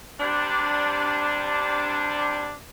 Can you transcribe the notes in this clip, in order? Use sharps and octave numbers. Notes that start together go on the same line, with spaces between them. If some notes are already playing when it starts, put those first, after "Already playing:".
C3 G3 D4